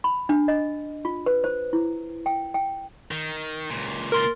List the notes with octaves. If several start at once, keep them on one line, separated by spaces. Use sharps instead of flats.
B5
D4
D#5
F4
B4
C5
E4
G5
G5
D#3
C#2 A#2
A#4 C6 A6